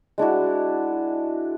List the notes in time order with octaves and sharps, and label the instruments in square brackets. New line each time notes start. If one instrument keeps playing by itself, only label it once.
[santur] G#3 D4 E4 F#4